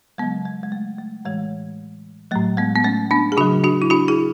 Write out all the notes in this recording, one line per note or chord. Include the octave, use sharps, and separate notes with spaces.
C#3 F#3 G#3 B3
G#3
G#3
A3
A3
A2 E3 G#3
A2 F#3 A3
G#3 B3
B3
A3 C#4
B3 D4
G#4
C#3 F#3 D4 F#4
D4 F#4
E4
D4 F#4
E4 G#4